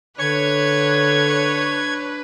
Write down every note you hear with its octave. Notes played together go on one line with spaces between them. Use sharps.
D3 D4 B4 C#5 G#6